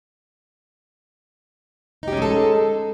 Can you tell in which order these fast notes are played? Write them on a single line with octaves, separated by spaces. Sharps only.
D#4 G4 C#4 G#3 A4